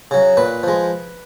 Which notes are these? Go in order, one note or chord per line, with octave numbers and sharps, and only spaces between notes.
C#3 F#3
A#2 B4
F3 G#3